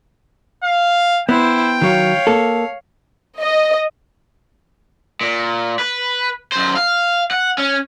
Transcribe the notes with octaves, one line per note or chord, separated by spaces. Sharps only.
F5
B3 E4 C5 G5
D#3 F#3 C#5 F5
A#3 A4
D#5
A#2
B4
F#2 C5
F5
F#5
C#4